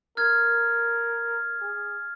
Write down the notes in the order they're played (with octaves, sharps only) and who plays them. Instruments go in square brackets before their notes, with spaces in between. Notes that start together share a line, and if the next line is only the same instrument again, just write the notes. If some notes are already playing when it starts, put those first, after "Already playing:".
[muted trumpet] A#4 [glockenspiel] F6 G#6
[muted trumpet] G#4